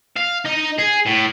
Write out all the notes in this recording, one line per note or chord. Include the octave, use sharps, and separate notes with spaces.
F5
D#4 D#5
G#4
A2